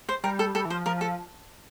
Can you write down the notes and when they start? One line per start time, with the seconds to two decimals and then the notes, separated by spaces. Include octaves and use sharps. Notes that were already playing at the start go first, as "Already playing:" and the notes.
0.09 C5
0.24 G3 A#4
0.39 A4
0.55 G3 A4
0.65 E3
0.70 F3 C5
0.86 F3 A#4
1.01 A4